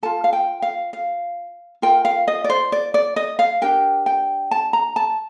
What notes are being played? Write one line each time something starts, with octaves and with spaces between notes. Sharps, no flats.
F4 A4 A5
F5
G5
F5
F5
F4 A#4 G5
F5
D#5
D5
C5
D5
D5
D#5
F5
D4 G4 A#4 G5
G5
A5
A#5
A5